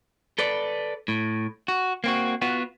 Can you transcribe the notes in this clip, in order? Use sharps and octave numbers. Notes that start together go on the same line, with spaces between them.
A4 B4 D5
A2
F#4
A#3 C4 F#4
B3 F4 F#4